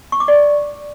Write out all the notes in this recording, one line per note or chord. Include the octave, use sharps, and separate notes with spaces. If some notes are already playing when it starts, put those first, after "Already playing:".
C#6
D6
D5